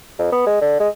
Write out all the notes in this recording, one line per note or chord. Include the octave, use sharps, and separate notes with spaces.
F2
B3
G#3
D3
G#3